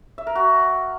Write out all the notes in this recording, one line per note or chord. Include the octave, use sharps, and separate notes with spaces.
E5
A#4
F#4